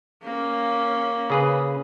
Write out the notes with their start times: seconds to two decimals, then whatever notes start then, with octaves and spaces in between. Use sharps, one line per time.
0.23 A#3 C#4
1.30 C#3 G#4 B4